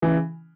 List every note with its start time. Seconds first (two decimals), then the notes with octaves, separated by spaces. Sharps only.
0.02 C#3 E3